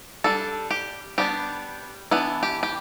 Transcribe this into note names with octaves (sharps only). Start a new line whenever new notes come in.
G3 D4 A4
G4
G3 B3 D4 G4
E3 B3 D4 E4
G4
G4